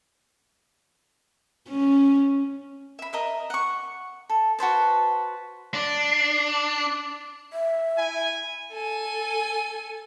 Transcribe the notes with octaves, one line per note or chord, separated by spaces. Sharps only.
C#4
E5 B5
A#4 D#5 E5
F#5 C#6
A4
F#4 B4 C5 A5
D4
E5
E4 G#5
A4 G#5